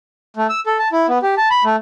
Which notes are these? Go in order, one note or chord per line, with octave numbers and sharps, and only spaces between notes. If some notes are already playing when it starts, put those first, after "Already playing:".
A3
E6
A4
A5
E4
B3
G4
A5
B5
A3